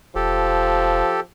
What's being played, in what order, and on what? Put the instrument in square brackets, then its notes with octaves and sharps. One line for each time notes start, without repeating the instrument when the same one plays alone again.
[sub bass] E1 [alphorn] F3 [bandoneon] G4 A4